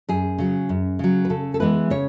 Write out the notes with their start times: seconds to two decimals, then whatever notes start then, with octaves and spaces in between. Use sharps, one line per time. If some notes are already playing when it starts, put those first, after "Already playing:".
0.09 F#2 G#4
0.38 C#3 F#3
0.69 F#2
0.99 C#3 F#3
1.25 B4
1.30 C#3 A4
1.54 A4
1.60 E3 G#3 B3 E4 B4
1.90 C#3 C#5